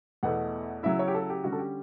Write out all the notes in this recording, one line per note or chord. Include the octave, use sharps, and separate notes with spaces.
E2 B2 A3 E4 F#5
C#3 F#3 C#4 E4 E5
C#5
G4
A4
G4
D3 G3 C#4 F#4
A4
G4